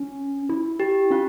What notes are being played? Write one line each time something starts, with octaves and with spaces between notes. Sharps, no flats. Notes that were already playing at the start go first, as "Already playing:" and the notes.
Already playing: C#4
E4
G4
C#4 F4